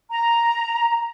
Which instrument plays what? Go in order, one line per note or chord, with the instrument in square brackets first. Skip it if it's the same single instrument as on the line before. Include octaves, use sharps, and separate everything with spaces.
[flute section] A#5